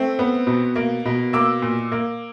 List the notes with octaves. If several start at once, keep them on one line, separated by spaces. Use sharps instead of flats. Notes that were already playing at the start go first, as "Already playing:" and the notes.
Already playing: A3 C4
B3
B2
A#3
B2
A#3 D6 E6
A#2
A#3